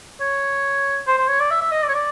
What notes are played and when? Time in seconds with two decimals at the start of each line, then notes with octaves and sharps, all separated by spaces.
0.21 C#5
1.07 C5
1.18 C5
1.29 C#5
1.40 D5
1.51 E5
1.61 E5
1.72 D#5
1.83 D5
1.89 C#5
1.94 D5